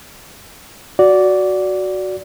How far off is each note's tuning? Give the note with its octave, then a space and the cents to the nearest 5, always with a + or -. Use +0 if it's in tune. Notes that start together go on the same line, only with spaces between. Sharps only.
F#4 +0 D5 -15